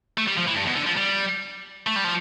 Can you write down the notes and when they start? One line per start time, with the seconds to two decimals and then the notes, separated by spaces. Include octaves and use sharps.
0.18 A3
0.28 G3
0.38 F3
0.48 E3
0.57 G2
0.68 B2
0.77 D3
0.87 F3
0.97 G3
1.87 A3
1.96 G3
2.04 F3